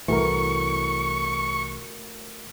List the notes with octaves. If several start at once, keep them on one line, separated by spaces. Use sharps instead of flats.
C2 A2 E3 A3 F#4 A#4 C#6